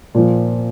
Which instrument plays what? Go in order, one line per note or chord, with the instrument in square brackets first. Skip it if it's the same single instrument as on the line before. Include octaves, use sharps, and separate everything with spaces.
[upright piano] A#2 F3